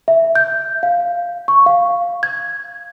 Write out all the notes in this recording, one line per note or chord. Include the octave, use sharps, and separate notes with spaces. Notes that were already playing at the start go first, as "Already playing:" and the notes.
E5
G6
F5
C#6
F5
G#6